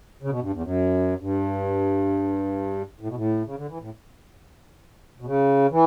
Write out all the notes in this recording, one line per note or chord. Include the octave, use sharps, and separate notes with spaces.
C#3
B2
G2
E2
F#2
G2
A2
B2
A2
C#3
D3
E3
A2
B2
C#3
E3